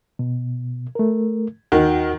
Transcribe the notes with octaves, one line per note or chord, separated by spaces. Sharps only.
B2
A3 A#4
D#2 D#3 F#4 F#5